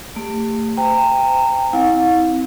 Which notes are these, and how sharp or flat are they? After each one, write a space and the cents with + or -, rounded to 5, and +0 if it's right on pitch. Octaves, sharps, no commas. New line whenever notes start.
A3 +30 G4 +35
C5 -30 G5 +15 A#5 -25
C4 +0 E4 -25 F5 +45